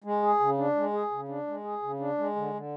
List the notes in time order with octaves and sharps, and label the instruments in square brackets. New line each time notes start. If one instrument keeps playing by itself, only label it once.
[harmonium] G#3
G#4
C#3
D4
G#3
G#4
C#3
D4
G#3
G#4
C#3
D4
G#3
D3
D3